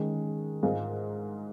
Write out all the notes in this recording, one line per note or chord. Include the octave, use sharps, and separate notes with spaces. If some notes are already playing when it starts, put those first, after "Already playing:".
Already playing: D#3 G#3 C#4
G#2 G#3 F4 A#4